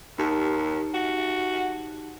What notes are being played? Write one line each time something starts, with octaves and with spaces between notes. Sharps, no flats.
D#2 D#4 G4 A5
F#4